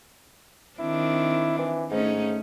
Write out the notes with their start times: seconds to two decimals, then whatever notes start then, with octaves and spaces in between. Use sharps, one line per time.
0.79 D#3 C4 D4 E4
1.59 E3
1.91 G#2 A3 C#4 D#4